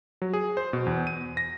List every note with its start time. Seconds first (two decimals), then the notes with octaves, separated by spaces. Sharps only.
0.22 F#3
0.33 G#4
0.57 C5
0.73 B2
0.86 E2
1.07 D#7
1.37 A#6